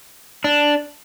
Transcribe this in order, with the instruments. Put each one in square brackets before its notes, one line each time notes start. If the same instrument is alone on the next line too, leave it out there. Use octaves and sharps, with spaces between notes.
[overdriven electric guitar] D4